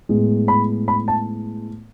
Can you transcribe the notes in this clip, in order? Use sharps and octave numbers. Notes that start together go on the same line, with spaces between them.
A2 G#3 B3
B5
B5
A5